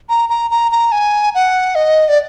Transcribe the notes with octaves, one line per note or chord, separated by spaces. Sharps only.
A#5
A#5
A#5
A#5
G#5
F#5
D#5
D5